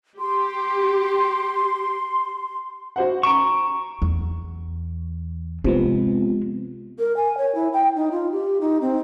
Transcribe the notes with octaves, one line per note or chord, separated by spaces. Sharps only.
G4 C6
F#4 C5 F#5
A#5 C#6 D7 E7
E2
C3 F3 G#3 B3
A#4
G#5
C#5
E4
G5
D#4
F4
G4
D#4
C4